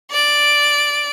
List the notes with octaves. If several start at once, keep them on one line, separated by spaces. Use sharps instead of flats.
D5 D7